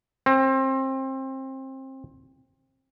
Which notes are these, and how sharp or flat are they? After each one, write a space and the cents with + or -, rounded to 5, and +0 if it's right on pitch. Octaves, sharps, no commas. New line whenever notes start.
C4 +25